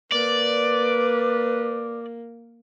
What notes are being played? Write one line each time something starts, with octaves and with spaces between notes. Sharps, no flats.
A#3 B4 D5